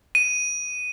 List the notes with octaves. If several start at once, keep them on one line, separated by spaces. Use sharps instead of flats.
D#7